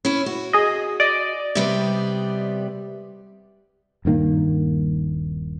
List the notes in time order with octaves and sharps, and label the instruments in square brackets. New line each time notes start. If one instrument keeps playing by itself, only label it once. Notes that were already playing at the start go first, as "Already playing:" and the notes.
[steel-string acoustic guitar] C#4 E4
F#4
[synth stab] G#4 D#5
D5 D#5
[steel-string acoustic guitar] C3 G3 B3
[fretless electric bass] D#1 G2 D#3 A#3